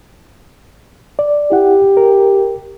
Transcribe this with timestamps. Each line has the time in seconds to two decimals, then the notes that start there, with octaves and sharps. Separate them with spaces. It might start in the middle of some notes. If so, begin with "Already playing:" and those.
1.19 D5
1.52 E4 G4 F#5
1.97 A#4